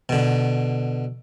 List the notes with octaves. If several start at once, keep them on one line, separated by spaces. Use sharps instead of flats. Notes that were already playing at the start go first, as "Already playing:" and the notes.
B2 D3